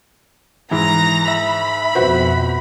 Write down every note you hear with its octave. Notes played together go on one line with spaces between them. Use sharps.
G#2 E3 E4 A#5 A#6
E5 B5
F2 B2 F#4 B4 C5